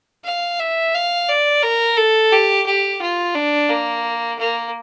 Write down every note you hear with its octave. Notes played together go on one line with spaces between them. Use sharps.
F5
E5
F5
D5
A#4
A4
G4
G4
F4
D4
A#3
A#3